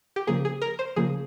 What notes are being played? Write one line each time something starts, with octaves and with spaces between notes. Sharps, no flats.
G4
C#3 F3 A#3 G#4
G#4
A#4
C5
C#3 F3 A#3 G#4